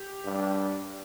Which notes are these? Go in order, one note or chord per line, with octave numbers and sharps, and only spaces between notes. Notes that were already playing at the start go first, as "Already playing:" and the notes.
Already playing: G4
G2